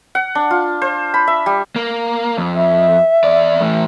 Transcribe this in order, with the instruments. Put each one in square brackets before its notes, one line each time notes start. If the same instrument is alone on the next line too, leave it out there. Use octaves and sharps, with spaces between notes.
[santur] F#5
D4
F4
C5
B5
E5
G3
[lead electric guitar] A#3
F2
[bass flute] E5
[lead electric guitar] E2 D5
E3 A3